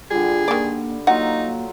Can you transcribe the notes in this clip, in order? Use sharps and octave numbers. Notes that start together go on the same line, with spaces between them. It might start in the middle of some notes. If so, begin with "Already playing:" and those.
D3 G3 F4 G#4
D#3 A#3 D5
F#3 A#3 D#4 F4 F#5